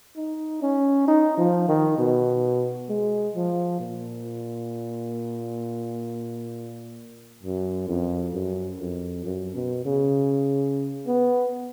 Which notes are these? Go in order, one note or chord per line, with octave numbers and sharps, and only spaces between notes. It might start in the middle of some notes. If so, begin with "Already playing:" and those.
D#4
C#4
D#4
F3
D#3
B2
G#3
F3
A#2
F#2
F2
F#2
F2
F#2
B2
C#3
B3